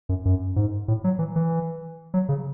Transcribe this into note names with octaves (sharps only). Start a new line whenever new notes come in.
F#2
F#2
G#2
A2
F#3
E3
E3
F#3
C#3